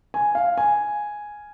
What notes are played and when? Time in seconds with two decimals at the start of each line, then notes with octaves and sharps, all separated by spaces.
0.14 G#5
0.35 F5
0.57 G#5